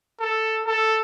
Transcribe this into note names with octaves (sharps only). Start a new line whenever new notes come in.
A4
A4